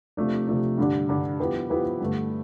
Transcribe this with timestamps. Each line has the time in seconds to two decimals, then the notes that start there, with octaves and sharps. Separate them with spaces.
0.17 C3 F3 A3 D4
0.47 C3 F3 A3 D4
0.78 G2 D3 G3 D4
1.09 G2 D3 G3 D4
1.40 F3 B3 E4 G4 B4
1.70 F3 B3 E4 G4 B4
2.01 G2 D3 A3